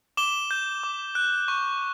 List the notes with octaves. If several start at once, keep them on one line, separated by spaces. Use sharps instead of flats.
D6 E7 G7
G6
D6
F#6
C#6